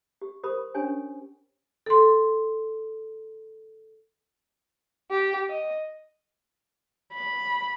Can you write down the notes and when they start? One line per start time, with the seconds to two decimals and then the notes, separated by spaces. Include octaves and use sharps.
0.22 G4
0.44 G4 A#4 C5 B5 D#6
0.75 C#4 D4 G4 C#5 G#5
1.86 A4 C6
5.11 G4
5.49 D#5
7.14 B5